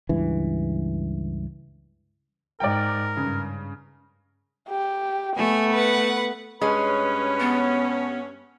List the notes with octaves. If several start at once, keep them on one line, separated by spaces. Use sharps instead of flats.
C#2 G2 E3
G#2 A#4 D5 G5
G2 C#3
G4
A3 B3 G#5
B4 F#5
G2 G#3 C#4 B4
B3